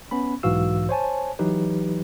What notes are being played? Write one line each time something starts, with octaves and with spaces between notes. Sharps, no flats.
B3 C#4 B5
B1 G#2 E3 F#4 F5 E6
C5 C#5 G#5 A5
E3 F#3 D#4 G4 B4